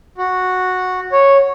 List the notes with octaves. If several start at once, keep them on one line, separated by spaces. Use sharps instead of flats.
F#4
C#5